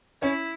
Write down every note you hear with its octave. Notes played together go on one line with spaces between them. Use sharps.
C#4 E4 C#5